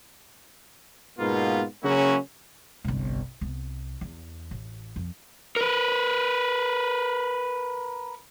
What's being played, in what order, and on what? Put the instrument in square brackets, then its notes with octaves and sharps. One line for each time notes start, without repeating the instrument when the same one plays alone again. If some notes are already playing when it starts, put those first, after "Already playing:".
[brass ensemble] G#2 B2 A#3 B3 F4
C#3 F#3 A#3 C#4 E4 F#4
[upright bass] G1 C2
C2 B3
E2
A1
F2
[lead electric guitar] A#4 B4